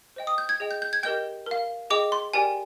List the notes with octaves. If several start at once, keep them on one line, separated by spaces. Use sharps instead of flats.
C5 D#5 G5
D#6
G6
G#6
G#4 D#5 G5
G6
G6
G#6
G4 A#4 D#5 G5 G6
A#4 F5
G#4 D#5 G5 D6
C6
G4 A#4 D5 G5 G#5